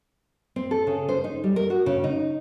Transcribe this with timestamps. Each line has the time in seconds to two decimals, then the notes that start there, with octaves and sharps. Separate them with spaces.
0.56 C4
0.71 A4
0.87 C#3
1.09 C5
1.24 D#4
1.44 G3
1.56 A#4
1.70 F#4
1.86 C#3
2.04 D#4